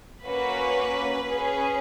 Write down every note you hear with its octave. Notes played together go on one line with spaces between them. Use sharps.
A#3 C#4 F#4 B4
C#4 G#4